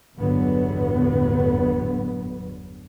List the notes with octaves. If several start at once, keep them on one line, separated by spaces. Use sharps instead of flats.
G1 E2 A2 D3 F#3 B3